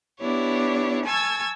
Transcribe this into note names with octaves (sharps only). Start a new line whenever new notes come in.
B3 D4 E4 G4 C#5
G#5 A5 C#6 E6 G#6 A6